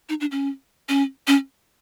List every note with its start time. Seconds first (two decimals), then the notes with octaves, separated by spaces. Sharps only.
0.09 D#4
0.21 D4
0.32 C#4
0.89 C#4
1.27 C#4